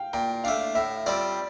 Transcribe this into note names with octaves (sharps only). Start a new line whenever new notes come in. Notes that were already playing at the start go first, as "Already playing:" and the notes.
Already playing: F5 G5
A#2 G5
A3 D4 F5
A2 E5
G3 C4 F4 D5